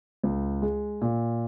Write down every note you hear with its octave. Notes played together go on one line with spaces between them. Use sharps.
C#2
G#3
A#2